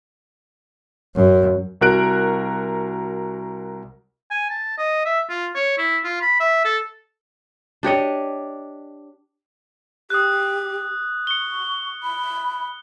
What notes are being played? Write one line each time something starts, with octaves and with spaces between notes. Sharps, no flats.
F#2
C2 F#4 A#4 F#6 D7
G#5
A5
D#5
E5
F4
C#5
E4
F4
B5
E5
A4
D4 G4 C#5 D#5
G4 D#6 F#6
C#6 C#7 G7
B5